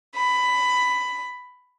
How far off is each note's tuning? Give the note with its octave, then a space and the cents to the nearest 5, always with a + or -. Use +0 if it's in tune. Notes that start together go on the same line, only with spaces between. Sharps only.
B5 +10